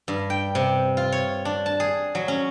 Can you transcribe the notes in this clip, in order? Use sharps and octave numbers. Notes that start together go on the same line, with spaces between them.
G2
G5
C3
F4
C#5
D4
A5
G#4
F#3
C#4